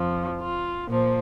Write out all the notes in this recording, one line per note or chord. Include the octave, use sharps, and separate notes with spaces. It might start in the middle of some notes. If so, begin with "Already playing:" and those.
Already playing: F2 F3
F4
A#2 F3